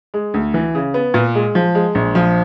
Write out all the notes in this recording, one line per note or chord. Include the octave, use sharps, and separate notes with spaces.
G#3
D2
E3
C#3
B3
A#2
G#3
F3
G#3
A#1
F3